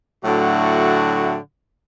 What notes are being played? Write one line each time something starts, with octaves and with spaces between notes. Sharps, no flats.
A2 D3 F#3 A3 F#4 F#5